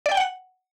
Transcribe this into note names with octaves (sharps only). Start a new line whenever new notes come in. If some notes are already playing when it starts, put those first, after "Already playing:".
D5
G5
F#5